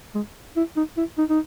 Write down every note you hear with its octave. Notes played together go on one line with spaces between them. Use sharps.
G#3
E4
D#4
E4
D#4
D#4